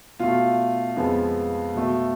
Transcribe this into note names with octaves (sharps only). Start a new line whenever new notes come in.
B2 A3 F4
F2 F3 G#3 B3
B2 A3